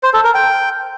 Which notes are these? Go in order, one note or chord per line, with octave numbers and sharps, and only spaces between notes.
C5
A4
A#4
G5